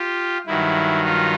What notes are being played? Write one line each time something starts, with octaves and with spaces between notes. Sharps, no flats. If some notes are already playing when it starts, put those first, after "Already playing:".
Already playing: F4 G4
G2 D#3 F#3 E4
D#4 F4